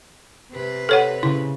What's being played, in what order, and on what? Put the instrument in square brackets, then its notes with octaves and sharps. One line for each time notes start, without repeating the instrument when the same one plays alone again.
[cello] C3 B4
[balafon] A4 C#5 F#5
[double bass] C#3 [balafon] E4